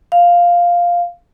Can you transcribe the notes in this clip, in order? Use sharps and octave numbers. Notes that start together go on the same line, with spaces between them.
F5